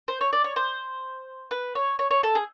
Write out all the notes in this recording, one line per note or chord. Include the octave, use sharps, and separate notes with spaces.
C5
C#5
D5
C#5
C5
B4
C#5
C#5
C#5
A4
G#4